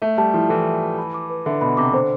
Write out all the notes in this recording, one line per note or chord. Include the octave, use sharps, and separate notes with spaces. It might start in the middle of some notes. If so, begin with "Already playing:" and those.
A3 E5
G3 A5
F3 E4
E3 A4
E5
A5
B5
D6
B4
D3 E5
B2 B5
C3 D6
D3 C5